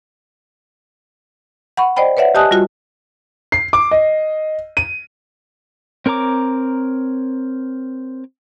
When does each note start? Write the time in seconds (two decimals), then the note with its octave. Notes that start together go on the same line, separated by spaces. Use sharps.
1.77 F#5 B5 C#6
1.96 C5 D5 D#5 G5 B5
2.17 B4 C#5 D5 E5 F#5
2.35 G4 D#5 G#5 A5 D#6 F#6
2.51 G3 F4 F#4
3.52 C7
3.73 D6
3.91 D#5
4.77 D#7
6.06 C4 A#4 C#5 A#5 D6